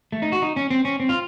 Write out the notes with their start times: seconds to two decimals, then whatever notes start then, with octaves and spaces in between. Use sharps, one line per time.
0.12 A3
0.22 D#4
0.32 F#4
0.42 D#4
0.56 C#4
0.70 C4
0.85 C#4
1.00 C4
1.09 F4